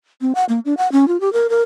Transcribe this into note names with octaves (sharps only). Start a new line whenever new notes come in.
C4
F#5
A#3
D4
F#5
C#4
F4
G4
A#4
A#4